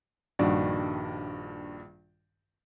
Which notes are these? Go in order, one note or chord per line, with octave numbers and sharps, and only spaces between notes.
A#1 G2 D#3 F#4 D5